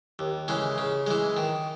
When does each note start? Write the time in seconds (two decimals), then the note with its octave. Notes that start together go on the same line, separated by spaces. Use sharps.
0.19 D#2
0.48 C#3 E3 G#3
0.78 C#3
1.07 E3 G#3
1.37 D#3